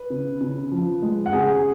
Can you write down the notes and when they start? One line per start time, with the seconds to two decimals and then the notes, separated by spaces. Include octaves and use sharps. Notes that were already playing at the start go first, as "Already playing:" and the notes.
Already playing: B4
0.10 C#3
0.41 C#3
0.71 F3
1.02 G#3
1.26 F#5
1.33 C#3 G#4 G#5